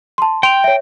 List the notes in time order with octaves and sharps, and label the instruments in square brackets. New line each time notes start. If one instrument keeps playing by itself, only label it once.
[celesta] A5 C6
[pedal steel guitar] G5 [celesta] C6 F7
[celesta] C#5 E5